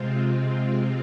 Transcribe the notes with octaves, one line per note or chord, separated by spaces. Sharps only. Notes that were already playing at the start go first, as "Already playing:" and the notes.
Already playing: C3 G#3 C4 F4